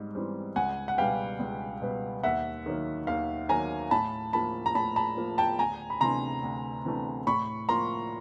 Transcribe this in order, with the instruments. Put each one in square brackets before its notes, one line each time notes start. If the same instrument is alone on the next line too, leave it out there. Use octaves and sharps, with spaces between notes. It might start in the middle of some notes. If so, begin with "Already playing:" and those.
Already playing: [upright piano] G#2 G3 C4
E3 G3 C4
C#2 F#5 G#5
F#5
B2 G3 B3 F5 G5
C#2
B2 G3 B3
D#2 E5 F#5
D#3 F#3 A#3
D#2 F5
D#3 F#3 A#3 G#5 A#5
A2 A5 B5
F3 A#3 A5 B5
A#5
A2 A5 B5
A5 B5
F3 A#3
G5 A5
D2 G#5 A#5
B5
C3 E3 A3 D4 A#5 C6
D2
C3 E3 A3 D4
A2 B5 C#6
F3 A#3 A#5 C6